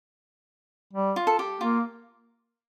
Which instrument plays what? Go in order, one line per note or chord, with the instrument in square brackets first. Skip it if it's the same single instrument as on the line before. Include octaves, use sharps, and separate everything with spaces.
[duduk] G3
[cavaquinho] F4
A4
G4
[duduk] A#3 [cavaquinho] F4